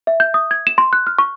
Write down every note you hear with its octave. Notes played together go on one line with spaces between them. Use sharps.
E5
G6
D#6
G#6
E7
C6
F#6
F6
C#6